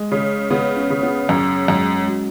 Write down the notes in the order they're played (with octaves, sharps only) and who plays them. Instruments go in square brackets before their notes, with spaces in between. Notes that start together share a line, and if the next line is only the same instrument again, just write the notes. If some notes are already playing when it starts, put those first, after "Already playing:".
Already playing: [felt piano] G#3
[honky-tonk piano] C#3
[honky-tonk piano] C#3 [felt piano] B3
[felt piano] C#4
[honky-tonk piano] C#3
[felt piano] B3
[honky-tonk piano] F#2 [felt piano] C#4
[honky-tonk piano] F#2 [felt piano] G#3
[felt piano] G#3
F#3